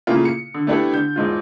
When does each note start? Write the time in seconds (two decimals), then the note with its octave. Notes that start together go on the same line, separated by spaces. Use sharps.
0.07 A#2 C#3 A3 A#3 E4 F4
0.25 C#7
0.54 D3
0.67 A3 B3 D4 E4 G4 A4
0.93 D3 G6
1.16 E1 G#2 F4